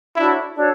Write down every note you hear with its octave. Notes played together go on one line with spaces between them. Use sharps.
D4 E4 F#4 A4 C#5
D4 F#4 A4 C#5